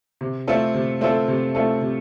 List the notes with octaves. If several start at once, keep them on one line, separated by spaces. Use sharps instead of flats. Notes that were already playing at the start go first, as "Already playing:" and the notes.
C3
A3 C4 F4 A4
C3
A3 C4 F4 A4
C3
A3 C4 F4 A4
C3